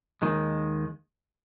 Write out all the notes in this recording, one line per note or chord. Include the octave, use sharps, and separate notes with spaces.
D#2 D#3 G#3